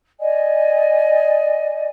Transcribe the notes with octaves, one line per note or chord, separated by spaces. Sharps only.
D5 D#5 G#5